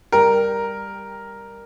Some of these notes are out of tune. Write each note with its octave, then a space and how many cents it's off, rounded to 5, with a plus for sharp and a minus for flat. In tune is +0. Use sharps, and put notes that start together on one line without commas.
G3 +15 A#4 +0 G5 +0